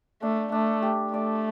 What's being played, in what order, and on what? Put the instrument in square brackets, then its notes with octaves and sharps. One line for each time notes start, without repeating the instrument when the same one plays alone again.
[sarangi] A3 [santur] D4
[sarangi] A3 [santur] D4
[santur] G4
[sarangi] A3 [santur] D5